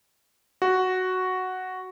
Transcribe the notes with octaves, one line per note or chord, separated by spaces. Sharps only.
F#4